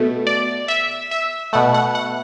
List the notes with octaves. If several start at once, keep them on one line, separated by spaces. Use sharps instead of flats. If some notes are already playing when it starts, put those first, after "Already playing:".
Already playing: B2 A3
D5
E5
E5
B2 A3 F#5
F#5
F#5